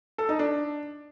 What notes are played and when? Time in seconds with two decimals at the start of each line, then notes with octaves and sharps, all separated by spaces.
0.18 A4
0.29 D#4
0.39 D4